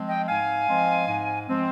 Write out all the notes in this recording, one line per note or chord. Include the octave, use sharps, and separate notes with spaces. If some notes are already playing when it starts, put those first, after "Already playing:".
Already playing: F3 G#3 C4
D#5 G5
G#2 F5 G#5
F3 G#3 C4
G#2
F3 G#3 C4